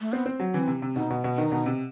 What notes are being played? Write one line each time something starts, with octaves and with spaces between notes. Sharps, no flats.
A3
B3 C4
C4
F#3
E3 C4
C3
C3
B2 D#4
B2
B2
D#3 D#4
B2
C3